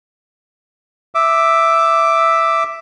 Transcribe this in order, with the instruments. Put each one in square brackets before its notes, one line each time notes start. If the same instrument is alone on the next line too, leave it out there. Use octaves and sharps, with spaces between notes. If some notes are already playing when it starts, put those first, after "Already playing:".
[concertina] E5 D6